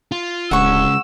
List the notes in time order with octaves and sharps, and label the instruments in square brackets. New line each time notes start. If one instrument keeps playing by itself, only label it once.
[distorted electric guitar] F4
[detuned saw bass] D1 [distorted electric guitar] C#3 G#3 [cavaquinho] F#5 C#6 [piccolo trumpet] E6